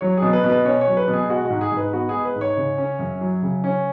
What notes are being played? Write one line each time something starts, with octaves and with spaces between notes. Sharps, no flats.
F#3 C#5
B2 G#4
B4
B2
B4
C#4 C#5
C#5
F#3
B4
B2
G#4
G#3 F#4
F#4
G#2
G#4
G#2
B4
B3 F#4
G#4
G#3
B4
G#2
C#5
C#3
C#4
F#2
F#3
C#3
C#4